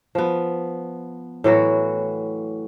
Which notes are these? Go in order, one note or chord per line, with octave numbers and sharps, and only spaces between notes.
F3 B3
A2 E3 F#3 F#4